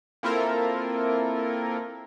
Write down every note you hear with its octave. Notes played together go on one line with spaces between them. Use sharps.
A#3 C4 E4 F4 A4 A#4